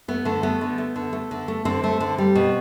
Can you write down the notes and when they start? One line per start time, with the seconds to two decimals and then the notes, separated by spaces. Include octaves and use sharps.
0.08 A3 B3
0.25 D3 A3
0.43 A3 B3
0.61 D3
0.78 A3
0.96 D3
1.13 A3
1.31 D3
1.48 A3
1.65 D3 C4
1.84 A3
2.00 D3
2.18 G3
2.35 B2